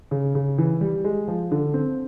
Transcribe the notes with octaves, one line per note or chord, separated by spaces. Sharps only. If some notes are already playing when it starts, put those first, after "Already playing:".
C#3
C#3
E3
G3
G#3
F3
D3
C4